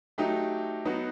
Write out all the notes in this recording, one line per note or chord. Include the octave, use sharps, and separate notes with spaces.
F#3 A3 D#4 G4
F#3 B3 D#4 F#4